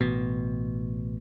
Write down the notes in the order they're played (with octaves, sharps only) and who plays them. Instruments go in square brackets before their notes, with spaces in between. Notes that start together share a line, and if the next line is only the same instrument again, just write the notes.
[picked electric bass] A1 B2